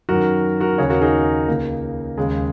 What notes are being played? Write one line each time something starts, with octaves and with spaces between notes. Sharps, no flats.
F#2 D#3 F#4 A#4
F#4 A#4
D#2 C#3 G#4 C#5
F#4 A#4
D#4 G#4
C#2 C#3 A#3
D#2 C#3 G#3